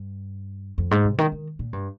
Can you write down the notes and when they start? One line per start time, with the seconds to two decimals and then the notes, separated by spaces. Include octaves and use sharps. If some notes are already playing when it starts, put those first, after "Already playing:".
Already playing: G2
0.78 F2
0.91 G#2
1.05 C3
1.18 D#3
1.32 D#3
1.59 A#2
1.73 G2